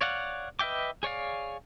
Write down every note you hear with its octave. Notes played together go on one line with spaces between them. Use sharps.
C#5 D5 F5 F#5
B4 D#5 E5 G5 D6
G#4 C#5 D5 F5